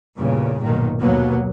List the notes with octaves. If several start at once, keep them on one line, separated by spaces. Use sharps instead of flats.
E2 G2 A#2 C#3
B1 A#2 D#3
D#2 B2 F#3 A#3 B3